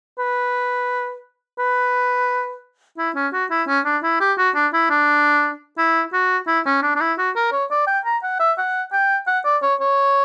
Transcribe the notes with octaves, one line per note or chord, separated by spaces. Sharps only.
B4
B4
E4
C#4
F#4
E4
C#4
D4
E4
G4
F#4
D4
E4
D4
E4
F#4
E4
C#4
D4
D4
E4
F#4
A#4
C#5
D5
G5
A#5
F#5
E5
F#5
G5
F#5
D5
C#5
C#5